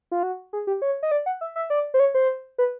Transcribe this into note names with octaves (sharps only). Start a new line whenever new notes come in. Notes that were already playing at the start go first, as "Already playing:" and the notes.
F4
F#4
G#4
G4
C#5
D#5
D5
F#5
E5
E5
D5
C5
C#5
C5
B4